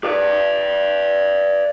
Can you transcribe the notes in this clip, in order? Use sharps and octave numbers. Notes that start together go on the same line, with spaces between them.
B4 D5